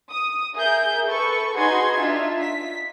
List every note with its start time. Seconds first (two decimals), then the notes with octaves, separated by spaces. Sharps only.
0.11 D#6
0.55 G#4 A#4 E5 G6
1.07 A4 B4 C#6
1.56 D#4 F#4 G#4 B4 C6 G#6
1.98 D4 D#4 F4 E5
2.41 B6